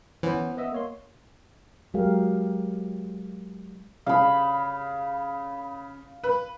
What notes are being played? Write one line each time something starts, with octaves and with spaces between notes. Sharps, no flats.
E3 B3 C#4 C5
B3 D#5 E5
A#3 C#5 C6
F#3 G#3 G4 G#4 A#4 F5
C#3 F5 B5
B4